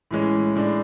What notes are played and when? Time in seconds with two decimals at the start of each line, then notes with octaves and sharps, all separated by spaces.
0.11 A2 E3 G#3 C#4
0.55 A2 G#3 D4